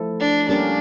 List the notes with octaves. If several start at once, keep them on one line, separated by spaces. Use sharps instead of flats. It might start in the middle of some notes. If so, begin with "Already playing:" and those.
Already playing: F3 A3 E4 A4
D4
G3 A#3 C#4 D4 G4 A#4